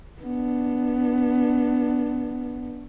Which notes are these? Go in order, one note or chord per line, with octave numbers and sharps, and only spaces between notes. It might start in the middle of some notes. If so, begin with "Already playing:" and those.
B3 D4